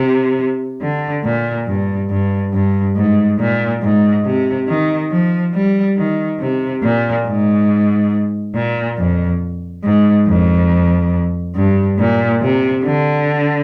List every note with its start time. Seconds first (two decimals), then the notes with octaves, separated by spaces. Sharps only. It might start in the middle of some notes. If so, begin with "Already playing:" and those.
Already playing: C3
0.81 D3
1.24 A#2
1.67 G2
2.10 G2
2.53 G2
2.96 G#2
3.39 A#2
3.82 G#2
4.25 C3
4.68 D#3
5.11 F3
5.54 G3
5.97 D#3
6.40 C3
6.82 A#2
7.26 G#2
8.55 A#2
8.98 F2
9.84 G#2
10.27 F2
11.56 G2
11.99 A#2
12.42 C3
12.85 D3